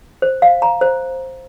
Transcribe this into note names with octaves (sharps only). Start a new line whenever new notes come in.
C5
F5
A#5
C5